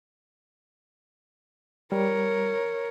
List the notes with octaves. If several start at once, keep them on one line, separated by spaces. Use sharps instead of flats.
G3 A#4 C#5